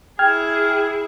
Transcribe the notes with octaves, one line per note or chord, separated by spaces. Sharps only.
E4 G#4 G5 F6 G#6